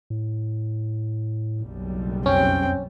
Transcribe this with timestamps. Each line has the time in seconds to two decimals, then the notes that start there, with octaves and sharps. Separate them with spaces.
0.10 A2
1.58 F#1 B1 G3
2.26 F2 C4 C#4 G5